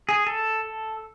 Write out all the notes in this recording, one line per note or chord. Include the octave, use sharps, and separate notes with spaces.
G#4
A4